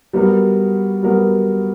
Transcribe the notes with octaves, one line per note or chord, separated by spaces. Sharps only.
G3 B3 F#4 A#4
G3 B3 F#4 A#4